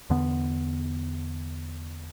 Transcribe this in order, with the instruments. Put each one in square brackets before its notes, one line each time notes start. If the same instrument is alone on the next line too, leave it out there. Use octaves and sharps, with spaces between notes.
[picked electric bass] E2 D3 B3